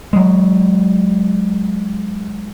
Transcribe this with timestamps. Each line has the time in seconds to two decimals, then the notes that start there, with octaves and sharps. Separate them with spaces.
0.13 F#3 G#3